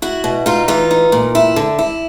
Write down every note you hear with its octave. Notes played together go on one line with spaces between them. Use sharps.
E4 F#4
B2
D#4 F4
E3 F4
D#4
A#2
E4
D3
E4